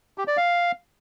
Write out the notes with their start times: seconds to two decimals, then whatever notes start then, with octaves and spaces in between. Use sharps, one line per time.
0.18 G4
0.28 D5
0.37 F5